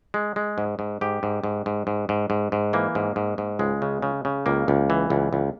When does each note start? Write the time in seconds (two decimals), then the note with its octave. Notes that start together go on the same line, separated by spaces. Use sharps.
0.14 G#3
0.36 G#3
0.58 G#2
0.79 G#2
1.01 G#2 G4
1.23 G#2
1.44 G#2
1.66 G#2
1.87 G#2
2.09 G#2
2.30 G#2
2.52 G#2
2.73 E3 A#3
2.95 G#2
3.16 G#2
3.38 G#2
3.59 C#2 G#3
3.82 C#3
4.02 C#3
4.25 C#3
4.46 C#2 A#3
4.68 C#2
4.90 E3
5.10 C#2
5.33 C#2